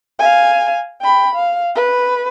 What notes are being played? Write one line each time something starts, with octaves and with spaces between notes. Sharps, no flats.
F5 G#5
G5 B5
F5
B4